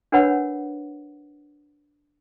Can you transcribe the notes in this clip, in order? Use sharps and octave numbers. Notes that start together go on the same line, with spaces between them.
D4 A#4 B4 C#5 F#5 B5